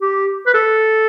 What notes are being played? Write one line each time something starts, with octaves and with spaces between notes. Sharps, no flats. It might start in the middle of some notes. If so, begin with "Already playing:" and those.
G4
B4
A4